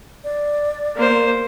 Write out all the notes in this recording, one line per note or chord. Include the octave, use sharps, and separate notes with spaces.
D5
A#3 C5